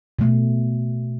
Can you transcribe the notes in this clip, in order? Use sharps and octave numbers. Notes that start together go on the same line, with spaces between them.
B2 A3